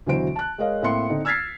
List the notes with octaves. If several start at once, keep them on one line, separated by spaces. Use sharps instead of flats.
D2 B2 E3 F#3 C5 D7
A5 F#6
G#3 A#4 C#5 D#5 F5
A2 A#3 C4 E5 C6 C#7
D3 C4 D#4
E6 F6 G#6 A6 B6 C7